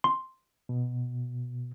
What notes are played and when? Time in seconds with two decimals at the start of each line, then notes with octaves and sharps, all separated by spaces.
0.04 C6
0.69 B2